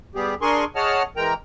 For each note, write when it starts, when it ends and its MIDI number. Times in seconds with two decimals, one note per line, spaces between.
0.15 0.34 55
0.15 0.34 59
0.15 0.34 67
0.15 0.34 68
0.42 0.65 62
0.42 0.65 68
0.42 0.65 70
0.42 0.65 80
0.42 0.65 84
0.42 0.65 85
0.76 1.03 68
0.76 1.03 73
0.76 1.03 75
0.76 1.03 78
0.76 1.03 81
0.76 1.03 89
1.17 1.34 52
1.17 1.34 56
1.17 1.34 70
1.17 1.34 79
1.17 1.34 82